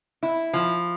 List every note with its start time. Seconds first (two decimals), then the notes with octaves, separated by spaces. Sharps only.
0.23 E4
0.53 F3